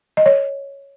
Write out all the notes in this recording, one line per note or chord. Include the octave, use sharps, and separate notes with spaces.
D#5
C#5